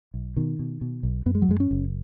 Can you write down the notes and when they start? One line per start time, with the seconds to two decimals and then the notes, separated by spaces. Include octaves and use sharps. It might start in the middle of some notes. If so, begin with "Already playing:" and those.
0.14 B1
0.36 B2 D#3
0.59 B2
0.81 B2
1.03 B1
1.26 F#2 B3
1.35 G#3
1.42 F#3
1.49 F#2 G#3
1.60 C#4
1.71 F#1